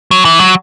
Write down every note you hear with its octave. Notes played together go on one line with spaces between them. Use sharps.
F#3
E3
F#3